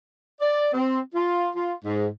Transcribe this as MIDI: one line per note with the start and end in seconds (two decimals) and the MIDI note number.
0.40 0.69 74
0.73 0.98 60
1.14 1.49 65
1.55 1.73 65
1.84 2.07 44